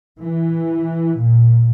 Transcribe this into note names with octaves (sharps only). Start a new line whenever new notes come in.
E3
A#2